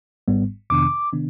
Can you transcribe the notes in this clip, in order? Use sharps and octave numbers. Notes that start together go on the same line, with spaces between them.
G#1 G#2 G3 B3
F2 C3 D#3 B3 D4 D6
C3 D#3 B3 D4